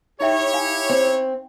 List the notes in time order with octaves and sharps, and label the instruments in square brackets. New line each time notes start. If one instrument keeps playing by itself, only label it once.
[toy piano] D#4 E5 G5 [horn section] E4 G4 C#5
[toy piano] F5 G#5
[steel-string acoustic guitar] C4